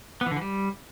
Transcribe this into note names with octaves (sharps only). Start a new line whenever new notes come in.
B3
E3
D3
E3
G3